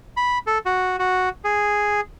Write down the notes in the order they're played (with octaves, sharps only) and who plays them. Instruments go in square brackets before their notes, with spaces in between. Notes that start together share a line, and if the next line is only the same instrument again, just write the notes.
[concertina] B5
A4
F#4
F#4
G#4